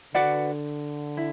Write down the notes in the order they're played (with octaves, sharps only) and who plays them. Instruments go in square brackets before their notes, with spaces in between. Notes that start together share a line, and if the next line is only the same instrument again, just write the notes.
[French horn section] D3 [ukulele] F#4 B4 D5 F#5
[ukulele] E4